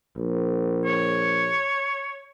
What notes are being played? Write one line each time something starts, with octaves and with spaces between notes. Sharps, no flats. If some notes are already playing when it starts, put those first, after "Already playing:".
A#1
C#5